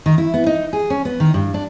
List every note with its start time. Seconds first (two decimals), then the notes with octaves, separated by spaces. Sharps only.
0.06 D#3
0.18 E4
0.34 B3
0.46 D#4
0.73 G#4
0.90 C#4
1.05 B3
1.20 D#3
1.34 G2
1.54 D4